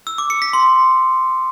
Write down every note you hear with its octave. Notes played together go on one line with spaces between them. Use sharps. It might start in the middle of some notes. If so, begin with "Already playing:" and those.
E6
D6
C#7
B6
C6